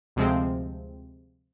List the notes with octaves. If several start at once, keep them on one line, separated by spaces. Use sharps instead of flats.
D2 C3 F3 G#3 C4